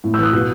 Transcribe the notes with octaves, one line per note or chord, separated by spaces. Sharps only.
A2
E6 G6
E3
D#6 F#6
B2